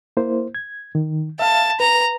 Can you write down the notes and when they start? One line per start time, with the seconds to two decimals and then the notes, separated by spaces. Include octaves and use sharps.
0.17 A#3 E4 C5
0.55 G#6
0.95 D#3
1.39 E5 F5 A5
1.80 B4 A#5